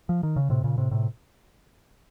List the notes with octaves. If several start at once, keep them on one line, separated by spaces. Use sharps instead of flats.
F3
D#3
C#3
A2 C3
A#2 C#3
A2 C3
A2 C3